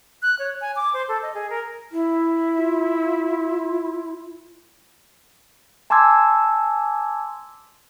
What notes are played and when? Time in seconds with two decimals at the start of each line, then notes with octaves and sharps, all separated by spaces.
0.22 F#6
0.39 C#5
0.61 G#5
0.76 D6
0.94 C5
1.09 A4
1.23 D#5
1.34 G#4
1.50 A#4
1.92 E4
2.57 F4
5.90 G#5 A5 C6 D6 E6 G#6